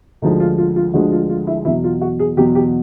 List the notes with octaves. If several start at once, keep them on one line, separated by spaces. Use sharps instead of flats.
D2 D3 F3 G#3 D#4
F4
F4
F4
D2 D3 F3 G#3 F#4
F4
F4
E4
E2 B2 F#3 E4
F4
F#4
G#4
E2 B2 F#3 G4
G4